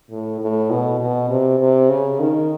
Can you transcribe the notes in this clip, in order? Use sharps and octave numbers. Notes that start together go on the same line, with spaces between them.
A2
A2
B2
B2
C3
C3
C#3
D#3